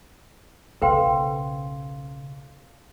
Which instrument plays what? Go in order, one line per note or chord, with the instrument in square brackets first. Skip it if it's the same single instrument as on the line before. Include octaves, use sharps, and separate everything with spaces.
[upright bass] B1 C#3 [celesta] A4 F5 C6 [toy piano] B4 C5 G5